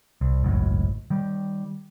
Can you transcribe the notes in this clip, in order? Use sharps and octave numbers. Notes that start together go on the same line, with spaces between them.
C2
G#1 C#2 F#2 A2
D#3 G3